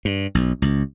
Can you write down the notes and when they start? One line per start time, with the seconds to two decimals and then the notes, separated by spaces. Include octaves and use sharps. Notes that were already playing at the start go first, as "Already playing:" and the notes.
0.05 G2
0.35 B1
0.62 C#2